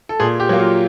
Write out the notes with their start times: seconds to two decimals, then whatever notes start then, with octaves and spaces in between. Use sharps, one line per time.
0.09 A4
0.20 A#2 G#4
0.40 G4
0.49 F#3 A#3
0.60 F4